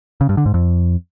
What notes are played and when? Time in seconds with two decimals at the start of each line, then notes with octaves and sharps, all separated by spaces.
0.21 C#3
0.29 G2
0.37 D3
0.46 G#2
0.54 F2